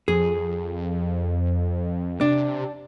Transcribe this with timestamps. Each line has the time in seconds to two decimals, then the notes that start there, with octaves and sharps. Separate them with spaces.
0.08 F2 G#4
2.21 C3 D4